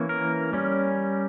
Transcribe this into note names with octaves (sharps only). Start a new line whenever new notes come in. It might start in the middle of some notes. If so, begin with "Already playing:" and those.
Already playing: E3 A#3 C#4
A#4
G3 C#4